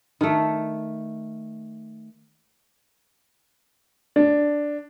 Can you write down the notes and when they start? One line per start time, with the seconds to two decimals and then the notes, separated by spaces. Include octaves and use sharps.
0.21 D#3 A3
4.16 D4